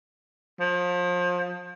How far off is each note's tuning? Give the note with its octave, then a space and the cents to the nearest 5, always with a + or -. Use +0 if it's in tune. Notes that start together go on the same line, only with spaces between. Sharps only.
F3 +30